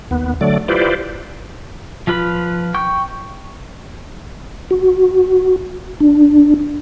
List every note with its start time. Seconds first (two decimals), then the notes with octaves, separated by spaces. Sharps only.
0.11 D#2 B3
0.41 D3 F#3 A3 D5
0.68 E4 F4 G4 B4 C5 D5
2.07 F3 F4 B4 B5
2.74 G5 C#6 G6
4.71 F#4
6.00 D4